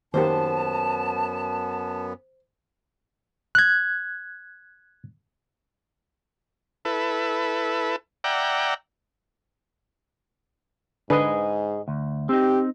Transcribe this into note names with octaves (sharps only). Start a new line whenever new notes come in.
F#2 D#3 A#3 B3 G4 C5 A5
F#6 G#6
E4 A4 B4
D5 E5 F#5 G5 A#5
G#2 D3 D4 G#4 B4 D#5
D2
C4 D#4 G4